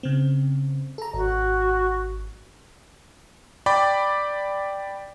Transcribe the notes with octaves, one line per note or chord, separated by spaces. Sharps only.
C#3 C4
A4 A#5
G#1 F#4
D5 G5 B5 D6